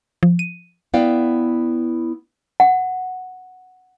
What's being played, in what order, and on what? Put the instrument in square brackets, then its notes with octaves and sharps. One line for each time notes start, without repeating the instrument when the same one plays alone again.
[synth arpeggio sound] F3
D#7
[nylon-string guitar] B3 E4 D5 F5 G5
[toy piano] F#5